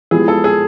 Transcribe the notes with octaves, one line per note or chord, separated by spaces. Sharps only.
F3 G#3 B3 E4 G4 G#4
A4
G#4